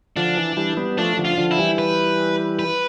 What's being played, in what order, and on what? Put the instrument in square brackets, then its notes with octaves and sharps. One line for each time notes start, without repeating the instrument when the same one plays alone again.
[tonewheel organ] D3 F3 [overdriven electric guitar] D4
[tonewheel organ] E3
E3 G3
G3 B3
[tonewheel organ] F3 A3 [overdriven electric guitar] D4
[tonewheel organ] D3 F3
[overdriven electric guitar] F4
[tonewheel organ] D3 F3
[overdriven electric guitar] E4
[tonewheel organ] E3 G3
[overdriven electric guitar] B4
B4